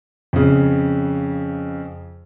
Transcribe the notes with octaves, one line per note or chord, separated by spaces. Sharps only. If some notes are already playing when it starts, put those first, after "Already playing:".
F2 C#3